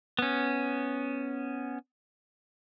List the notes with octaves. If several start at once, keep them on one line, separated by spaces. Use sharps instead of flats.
B3 C#4